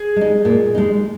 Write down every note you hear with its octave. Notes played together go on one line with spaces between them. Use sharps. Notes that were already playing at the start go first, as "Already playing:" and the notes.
Already playing: G#4
G#3 D#4
A#2
G#3 D#4